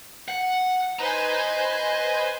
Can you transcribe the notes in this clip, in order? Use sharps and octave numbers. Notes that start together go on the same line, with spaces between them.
F#5
B4 C5 D#5 G#5 A#5